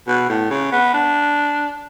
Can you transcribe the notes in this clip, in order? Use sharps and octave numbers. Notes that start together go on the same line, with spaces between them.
B2
A2
C#3
B3
D4